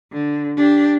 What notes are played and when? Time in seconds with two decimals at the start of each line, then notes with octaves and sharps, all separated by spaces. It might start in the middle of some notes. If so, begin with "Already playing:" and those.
0.12 D3
0.57 D4 G4